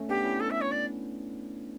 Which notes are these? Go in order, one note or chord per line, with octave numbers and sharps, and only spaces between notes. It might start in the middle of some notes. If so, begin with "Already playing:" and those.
Already playing: A3 C#4
B3 D4 G4
C#4 E4
A4
E5
C#5
D5